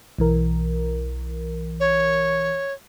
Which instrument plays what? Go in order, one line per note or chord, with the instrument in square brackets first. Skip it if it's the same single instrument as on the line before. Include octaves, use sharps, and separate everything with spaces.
[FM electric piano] B1 E3 A#4
[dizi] C#5